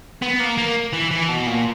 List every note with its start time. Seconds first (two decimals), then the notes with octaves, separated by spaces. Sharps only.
0.22 B3
0.40 A#3
0.58 A#3
0.93 E3
1.11 E3
1.29 B2
1.47 A#2